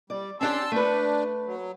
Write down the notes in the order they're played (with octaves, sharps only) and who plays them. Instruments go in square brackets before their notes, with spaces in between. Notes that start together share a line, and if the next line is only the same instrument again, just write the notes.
[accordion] G3 [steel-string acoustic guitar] D5
[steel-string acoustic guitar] C#4 D4 G4 [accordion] A5 C6 E6
[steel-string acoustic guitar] A3 B4 [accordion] D4
[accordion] F#3